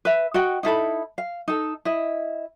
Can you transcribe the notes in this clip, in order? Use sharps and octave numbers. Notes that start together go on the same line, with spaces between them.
B4 E5
F#4 D#5 F#5 G5
D#4 E4 A4 B5
F5
D#4 A4
E4 D#5